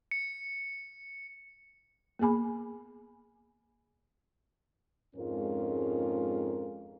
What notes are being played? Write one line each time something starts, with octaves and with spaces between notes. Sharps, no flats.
C#7
A#3 B3 G#4 G#5 B5
F2 G#2 G#3 C#4 F4 A#4